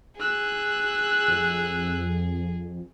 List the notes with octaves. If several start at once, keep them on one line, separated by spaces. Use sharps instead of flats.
G#4 E6 F#6
F2